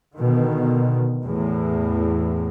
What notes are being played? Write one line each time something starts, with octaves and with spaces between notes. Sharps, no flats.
B2 D3 D#3
E2 A2